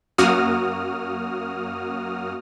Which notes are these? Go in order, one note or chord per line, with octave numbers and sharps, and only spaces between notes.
F#2 A#3 F#4 D#6 F6